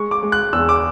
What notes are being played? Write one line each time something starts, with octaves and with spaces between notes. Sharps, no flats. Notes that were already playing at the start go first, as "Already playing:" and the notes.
Already playing: G#3 C#6
D6
G#3
F#6
E2 E6
D6